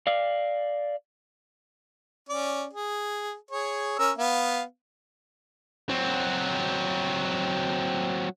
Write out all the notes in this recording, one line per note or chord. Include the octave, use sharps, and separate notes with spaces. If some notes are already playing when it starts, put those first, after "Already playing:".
D5 F5
C#4 D5
G#4
G#4 C#5
C#4 A#4 E6
B3 F5
F#3 C4